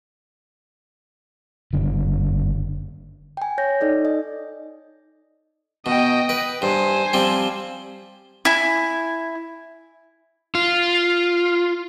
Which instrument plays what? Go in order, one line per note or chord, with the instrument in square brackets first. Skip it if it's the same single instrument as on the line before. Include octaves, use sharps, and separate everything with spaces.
[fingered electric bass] F#1 D3
[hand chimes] G5 G#5
C#5 G6 A#6
D#4 A4 D5 D#5
D#5
[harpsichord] B2 [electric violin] D#5 G5
[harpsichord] B4
[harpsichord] G2 [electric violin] C5 G#5
[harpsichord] F3 G3 C4
[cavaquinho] E4 G#5
[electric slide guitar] F4